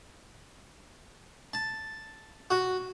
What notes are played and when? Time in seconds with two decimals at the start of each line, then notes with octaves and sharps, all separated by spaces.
1.53 A5
2.51 F#4